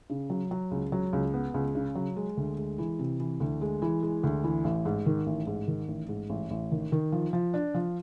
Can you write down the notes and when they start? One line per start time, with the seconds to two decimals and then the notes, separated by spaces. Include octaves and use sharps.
0.10 C#3
0.30 F#3
0.51 F#3
0.71 C#2
0.92 F#3
1.13 C#2
1.34 B3
1.54 C#2
1.75 C#3
1.95 F#3
2.16 G#3
2.37 D2
2.57 G#3
2.78 E3
2.99 C3
3.20 E3
3.40 D2
3.61 G#3
3.82 E3
4.02 G#3
4.23 D2
4.44 E3
4.64 A1
4.85 G#2
5.06 D#3
5.26 A1
5.47 G#2
5.68 D#3
5.88 A1
6.09 G#2
6.30 A1
6.50 A1
6.71 D#3
6.92 D#3
7.12 F3
7.33 F3
7.54 D4
7.74 F3